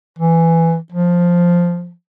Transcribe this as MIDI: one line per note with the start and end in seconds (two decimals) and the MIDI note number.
0.19 0.77 52
0.92 1.92 53